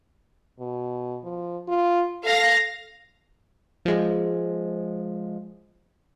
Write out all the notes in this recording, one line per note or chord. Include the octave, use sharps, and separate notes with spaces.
B2
F3
F4
A4 F5 A#6
F3 G#3